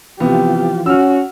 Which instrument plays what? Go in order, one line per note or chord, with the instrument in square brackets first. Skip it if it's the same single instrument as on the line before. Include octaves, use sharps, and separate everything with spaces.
[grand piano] C3 B3 [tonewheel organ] E3 F3 F4 [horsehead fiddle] G4
[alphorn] C#4 [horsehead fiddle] F#4 [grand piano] E6 F6